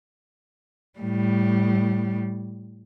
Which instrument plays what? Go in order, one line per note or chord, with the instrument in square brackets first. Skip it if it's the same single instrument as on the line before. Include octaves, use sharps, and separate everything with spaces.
[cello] A2 G3